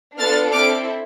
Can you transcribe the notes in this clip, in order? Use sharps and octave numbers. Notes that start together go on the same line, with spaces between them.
B3 D4 F4 A4 F6 A6
C4 E4 A4 D6 F6